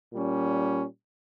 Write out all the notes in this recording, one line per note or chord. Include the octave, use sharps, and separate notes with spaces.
A#2 G3 C#4